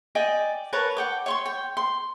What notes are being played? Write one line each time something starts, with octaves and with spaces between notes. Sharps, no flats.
D5 D#5 G5 G#5
A#4 B4 C#5 A5
F#5 G5 D6
C#5 C6 C#6
G5
C6